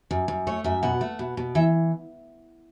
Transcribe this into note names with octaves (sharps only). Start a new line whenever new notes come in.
F#2
F#2
A3 C#5
F#2 E5
B2 F#5
A3
B2
B2
E3 E5